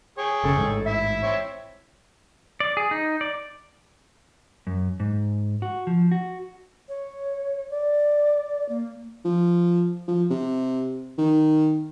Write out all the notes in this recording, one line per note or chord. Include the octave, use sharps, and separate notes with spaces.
G#4 C#5 G5
F#1 C#3 A4
A1 G#2
E4 E5
C4 E4 C#5
D5
G#4
D#4
D5
F#2
G#2
F#4
F3
F#4
C#5
D5
A#3
F3
F3
C3
D#3